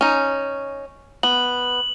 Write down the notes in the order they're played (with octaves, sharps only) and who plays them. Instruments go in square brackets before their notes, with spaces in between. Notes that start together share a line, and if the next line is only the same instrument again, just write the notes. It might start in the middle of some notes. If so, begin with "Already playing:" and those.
[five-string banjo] C#4 D#4
[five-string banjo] B3 [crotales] F#7